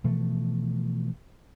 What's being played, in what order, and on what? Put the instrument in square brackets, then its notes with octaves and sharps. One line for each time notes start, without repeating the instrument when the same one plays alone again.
[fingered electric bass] B2 E3 F3 A3